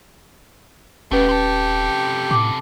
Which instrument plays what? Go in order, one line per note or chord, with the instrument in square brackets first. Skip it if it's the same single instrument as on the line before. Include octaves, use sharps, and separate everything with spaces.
[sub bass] D#1 [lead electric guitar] A3 B3 [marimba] C#4 B4 [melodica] G4
[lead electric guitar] C3 A4
[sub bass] A2 [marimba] D6